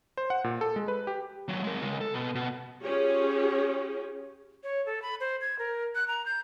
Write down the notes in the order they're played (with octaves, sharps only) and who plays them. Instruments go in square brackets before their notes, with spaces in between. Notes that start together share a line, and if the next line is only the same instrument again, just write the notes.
[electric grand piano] C5
F#5
A#2
A4
G#3
B4
G4
[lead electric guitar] D#2 F#3
G#3 A#4
C#3 G#3
A4
B2
B2
[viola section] C#4 F4 G4 G#4 C#5
[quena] C#5
A4
B5
C5
G#6
A#4
F#6
A#5
G6